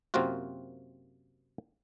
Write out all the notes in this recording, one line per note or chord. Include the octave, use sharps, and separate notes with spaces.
F#2 C3 A#3 C4 F4 F#4